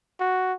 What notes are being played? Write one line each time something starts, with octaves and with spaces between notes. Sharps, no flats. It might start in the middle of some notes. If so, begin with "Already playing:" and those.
F#4